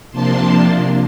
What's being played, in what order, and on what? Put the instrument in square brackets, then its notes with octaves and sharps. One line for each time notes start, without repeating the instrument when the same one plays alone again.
[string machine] C3 F3 A#3 D4 A5 C6